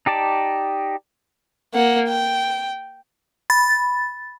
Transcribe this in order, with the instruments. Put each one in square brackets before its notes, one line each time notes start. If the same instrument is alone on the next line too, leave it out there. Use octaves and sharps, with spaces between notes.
[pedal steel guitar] D#4 G4 D5 A5
[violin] A#3 F#5
G5
[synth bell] B5 A6